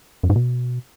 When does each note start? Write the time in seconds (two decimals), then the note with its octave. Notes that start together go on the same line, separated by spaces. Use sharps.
0.23 F#2
0.30 G#2
0.36 B2